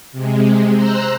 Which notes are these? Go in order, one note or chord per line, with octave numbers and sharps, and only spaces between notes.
C3 G#3
C5 A#5 C6 E6 F#6